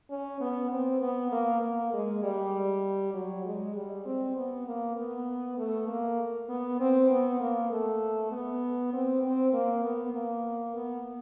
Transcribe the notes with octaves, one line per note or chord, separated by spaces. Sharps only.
C#4
B3
C4
B3
A#3
A#3
G#3
G3
F#3
G#3
G3
C4
B3
A#3
B3
A3
A#3
B3
C4
B3
A#3
A3
B3
C4
C4
A#3
B3
A#3
B3